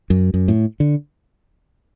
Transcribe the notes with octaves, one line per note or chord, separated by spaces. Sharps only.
F#2
F#2
A2
D3